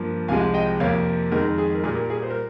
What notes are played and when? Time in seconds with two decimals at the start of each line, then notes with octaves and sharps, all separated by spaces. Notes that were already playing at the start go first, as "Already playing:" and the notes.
Already playing: G2 F3 A#3
0.28 C2 C3 F3 G#3 F5 G#5
0.54 D#5 G5
0.80 F2 C3 F3 A#3 C#5 F5
1.32 F2 D#3 G#3 A#4
1.58 G#4
1.74 A#4
1.84 A#2 G3 A#3 G#4
1.96 A#4
2.10 G#4
2.23 C5
2.30 A#4